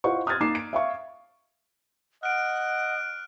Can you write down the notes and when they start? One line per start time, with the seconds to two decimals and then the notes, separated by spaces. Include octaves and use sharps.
0.04 E4 F4 C5 D#5 F#5 C#6
0.27 D#6 F6 F#6 G#6 A6
0.40 A#3 D#4 D6 C7 E7
0.55 D7
0.73 E5 F5 C#6
2.23 D#5 F#5 F6 F#6 D7